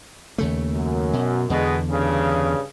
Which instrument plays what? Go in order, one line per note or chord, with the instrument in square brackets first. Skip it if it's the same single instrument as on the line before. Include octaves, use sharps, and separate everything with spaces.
[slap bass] D#2 C#3 A3
[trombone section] F#2
[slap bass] B2
[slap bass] E2 D3 [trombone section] B2 G#3
[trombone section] G2 C#3